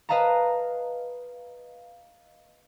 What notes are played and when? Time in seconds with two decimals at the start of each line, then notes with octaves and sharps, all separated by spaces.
0.09 B4 D#5 F5 A5 A#5